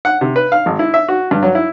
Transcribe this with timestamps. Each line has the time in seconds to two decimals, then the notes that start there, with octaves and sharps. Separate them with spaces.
0.05 F#5
0.21 C3
0.36 B4
0.52 F5
0.66 G#1
0.79 E4
0.94 E5
1.08 F#4
1.31 G2
1.43 F#3
1.55 E4